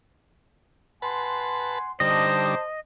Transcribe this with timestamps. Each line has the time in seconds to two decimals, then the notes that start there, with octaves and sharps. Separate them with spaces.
1.02 B4 F#5 G#5 A5 C6
2.00 D3 G3 D#4 C5 D#5 A5